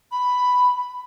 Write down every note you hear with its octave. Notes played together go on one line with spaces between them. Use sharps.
B5